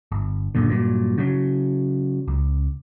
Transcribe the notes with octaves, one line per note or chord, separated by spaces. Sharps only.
G1
D1 F#2 A#2 D3
G2 A#2 F#3
C#3 F#3
C#2